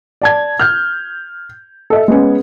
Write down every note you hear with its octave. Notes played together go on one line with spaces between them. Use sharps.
D5 A5 G#6
F6 G6
A4 D#5 E5
G#3 B3 C#4